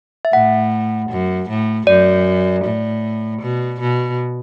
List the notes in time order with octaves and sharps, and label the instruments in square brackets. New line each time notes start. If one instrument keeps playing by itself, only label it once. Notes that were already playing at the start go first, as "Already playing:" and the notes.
[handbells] E5
[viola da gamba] A2 [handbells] F#5
[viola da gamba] F#2
A2
[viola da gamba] F#2 [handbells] D5
[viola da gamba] A2
B2
B2